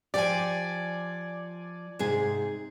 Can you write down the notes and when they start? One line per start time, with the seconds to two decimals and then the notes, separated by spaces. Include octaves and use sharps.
0.14 F3 G4 D5 G#5
1.99 G#2 C3 G#4